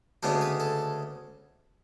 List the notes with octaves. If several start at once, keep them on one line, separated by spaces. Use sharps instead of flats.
D2 C#3 G#3 B3 D4 A4
B4
A4